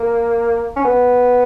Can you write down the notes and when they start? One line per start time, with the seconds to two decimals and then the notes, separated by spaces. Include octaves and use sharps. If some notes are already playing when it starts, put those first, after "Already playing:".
Already playing: A#3
0.76 C#4
0.85 B3